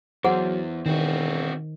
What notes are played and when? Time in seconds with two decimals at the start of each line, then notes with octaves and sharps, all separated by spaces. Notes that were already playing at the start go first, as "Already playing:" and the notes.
0.25 E2 F#3 G#4 C5 F#5
0.86 E1 D#3 C4 F#4